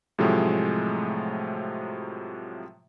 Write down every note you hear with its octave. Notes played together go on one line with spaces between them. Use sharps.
A2 C3 F3 F#3 G#3 A3